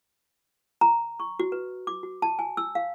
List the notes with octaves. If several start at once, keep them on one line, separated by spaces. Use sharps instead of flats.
A#5
C#6
F#4
B4
D6
F#4
A5
G#5
E6
F5